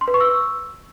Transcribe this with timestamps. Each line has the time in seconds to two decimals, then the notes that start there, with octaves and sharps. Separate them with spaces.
0.01 C6
0.08 B4
0.14 C#6
0.21 E6